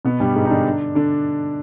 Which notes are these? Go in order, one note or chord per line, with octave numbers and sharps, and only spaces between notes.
B2 B3
G2 G3
G#2 G#3
D#4
D3 D4
D3 D4